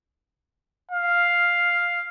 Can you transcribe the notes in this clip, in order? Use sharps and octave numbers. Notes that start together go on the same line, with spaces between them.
F5